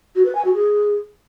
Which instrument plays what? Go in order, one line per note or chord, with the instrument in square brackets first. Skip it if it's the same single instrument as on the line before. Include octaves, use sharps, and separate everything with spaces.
[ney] F#4
B4
G#5
F#4
G#4